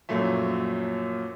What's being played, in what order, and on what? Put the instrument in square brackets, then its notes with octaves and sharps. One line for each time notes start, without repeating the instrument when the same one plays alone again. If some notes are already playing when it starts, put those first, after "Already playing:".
[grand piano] F#2 A#2 F3 F#3 A3